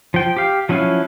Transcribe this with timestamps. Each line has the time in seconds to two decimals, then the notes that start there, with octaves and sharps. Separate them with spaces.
0.14 F3 G5
0.37 G4 F5
0.69 F3 F#3 C#4 E4 F5